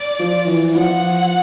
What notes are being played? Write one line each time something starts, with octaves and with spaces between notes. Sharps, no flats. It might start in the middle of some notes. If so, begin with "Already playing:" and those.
Already playing: D5
F3
E3
F3 F#5